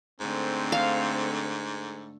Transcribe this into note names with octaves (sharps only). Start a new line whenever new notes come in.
G#2 D3 A3 C4 A4
F5